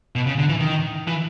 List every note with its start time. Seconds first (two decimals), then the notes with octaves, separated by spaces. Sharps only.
0.15 B2
0.27 C#3
0.39 D3
0.49 E3
0.61 D#3
1.08 E3